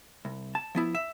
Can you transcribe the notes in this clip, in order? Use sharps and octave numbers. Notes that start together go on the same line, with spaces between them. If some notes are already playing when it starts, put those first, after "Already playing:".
C2
A5
F3 B3 E4
E5